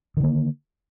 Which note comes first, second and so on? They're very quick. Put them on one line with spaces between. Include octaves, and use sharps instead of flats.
D#3 D3 A#3